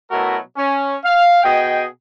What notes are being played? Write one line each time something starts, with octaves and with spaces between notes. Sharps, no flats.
B2 F#3 A3 E4 F#4 A#4
C#4
F5
B2 G#4 D#5 G5